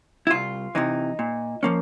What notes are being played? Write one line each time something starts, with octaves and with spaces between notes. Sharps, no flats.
E4
C2 F4
C3 E3 D#4
A#2
F3 A#3 C#4